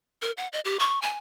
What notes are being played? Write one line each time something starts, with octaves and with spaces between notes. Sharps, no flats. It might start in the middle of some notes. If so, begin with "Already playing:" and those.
A#4
F#5
D#5
G4
C#6
G#5